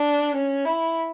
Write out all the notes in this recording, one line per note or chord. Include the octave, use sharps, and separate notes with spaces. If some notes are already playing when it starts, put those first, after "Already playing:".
Already playing: D4
C#4
E4